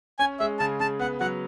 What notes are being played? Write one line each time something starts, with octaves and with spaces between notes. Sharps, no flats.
C#4 G#5
G#3 E5
C#3 A5
C#3 A5
B3 F#5
F#3 F#5